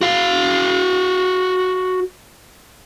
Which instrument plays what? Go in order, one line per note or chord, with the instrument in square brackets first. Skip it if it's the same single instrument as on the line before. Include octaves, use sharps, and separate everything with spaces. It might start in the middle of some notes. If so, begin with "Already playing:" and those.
[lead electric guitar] F#4 F5